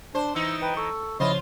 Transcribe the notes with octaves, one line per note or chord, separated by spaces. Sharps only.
D4 C5
E3 D#4 E6
B4 G5
A4 C#6
C#3 F3 E4 F4 C5 C#5 D#5